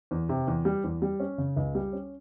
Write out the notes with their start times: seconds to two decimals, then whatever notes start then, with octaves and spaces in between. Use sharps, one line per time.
0.11 E2
0.29 C3
0.47 E2
0.65 G3
0.84 E2
1.02 G3
1.20 C#4
1.38 C#3
1.56 C#2
1.75 G3
1.93 C#4